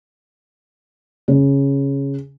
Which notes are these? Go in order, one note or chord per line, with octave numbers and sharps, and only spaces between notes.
C#3